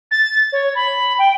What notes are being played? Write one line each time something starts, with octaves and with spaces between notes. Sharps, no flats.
A6
C#5
B5
G5